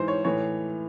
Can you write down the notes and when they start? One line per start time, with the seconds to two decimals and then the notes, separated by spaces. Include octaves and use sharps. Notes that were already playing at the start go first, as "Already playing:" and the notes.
Already playing: G#2 E3 C5
0.08 C#5
0.25 A2 E3 C#5